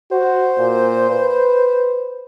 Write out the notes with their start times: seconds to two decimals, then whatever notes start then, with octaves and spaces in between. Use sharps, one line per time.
0.12 F#4 C5
0.59 A#2
1.11 B4